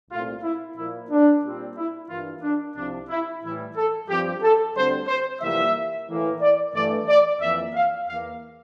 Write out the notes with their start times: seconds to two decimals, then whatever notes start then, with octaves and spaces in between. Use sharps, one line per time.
0.10 C2 A#2 A3 C4 F4
0.43 E4
0.77 A#2 F3 A#3 E4
1.10 D4
1.43 A#2 G3 C4
1.77 E4
2.09 G2 E3 A#3 F4
2.43 D4
2.76 C2 C3 F3 D4
3.09 E4
3.43 A2 E3 G3 E4
3.76 A4
4.08 G2 F3 C4 G4
4.42 A4
4.75 D2 D3 G3 C4 C5
5.08 C5
5.41 F2 C3 E3 G3 A#3 E5
6.08 A2 E3 A#3
6.41 D5
6.74 G2 E3 A3 D5
7.08 D5
7.41 F2 E3 A#3 E5
7.74 F5
8.07 E2 E3 A#3 F5